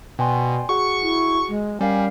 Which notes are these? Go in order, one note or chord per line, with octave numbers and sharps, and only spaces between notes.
B2 D5 G5 G#5 C6
F#4 G#4 F#5 C#6
E4
G#3
G3 C#4 A#4 F5 G#5